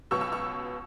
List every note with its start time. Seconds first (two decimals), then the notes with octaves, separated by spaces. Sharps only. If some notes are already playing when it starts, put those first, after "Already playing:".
0.11 C#2 B2 F#3 B3 C#6 E6
0.21 C#6 E6
0.32 C#6 E6